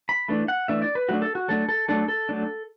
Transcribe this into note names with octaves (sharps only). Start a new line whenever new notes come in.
B5
E3 A3 D4
F#5
E3 A3 D4 E5
D5
B4
F#3 A3 D4 F#4
A4
F#4
F#3 A3 D4 A4
A4
F#3 A3 D4 A4
A4
F#3 A3 D4